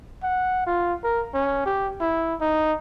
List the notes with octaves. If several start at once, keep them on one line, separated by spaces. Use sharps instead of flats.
F#5
F4
A#4
C#4
G4
E4
D#4